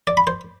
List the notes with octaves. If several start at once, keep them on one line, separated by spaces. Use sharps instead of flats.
D5
B5
C5